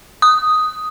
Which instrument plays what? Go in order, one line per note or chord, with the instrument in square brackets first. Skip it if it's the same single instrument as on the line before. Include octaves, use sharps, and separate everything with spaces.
[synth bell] D#6